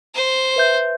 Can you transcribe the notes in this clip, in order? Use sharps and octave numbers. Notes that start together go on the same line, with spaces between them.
C5
B4 E5 G6